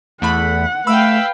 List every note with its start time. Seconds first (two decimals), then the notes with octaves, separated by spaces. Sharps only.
0.22 E2 A3 F#5 B5
0.87 A3 B4 F5 G5 B5 E6